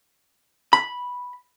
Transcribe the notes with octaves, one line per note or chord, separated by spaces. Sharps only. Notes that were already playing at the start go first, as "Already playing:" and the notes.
B5